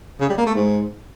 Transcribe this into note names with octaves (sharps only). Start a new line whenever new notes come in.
C#3
G3
A#3
A3
G#2